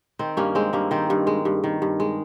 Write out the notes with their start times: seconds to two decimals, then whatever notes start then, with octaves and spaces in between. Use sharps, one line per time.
0.19 D#3 C4
0.37 G2 A#3 C#4
0.55 G#3 C4
0.73 G2 A#3
0.91 D#3 C4
1.10 G2
1.27 G#3
1.45 G2
1.64 D#3
1.82 G2
2.00 G#3